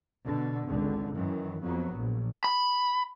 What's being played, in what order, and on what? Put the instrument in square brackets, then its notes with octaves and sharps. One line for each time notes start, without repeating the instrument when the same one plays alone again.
[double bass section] B2 D3
G#1 C#2 D3
F#2 D#3 E3
F2 F#3 B3
A#1
[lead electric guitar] B5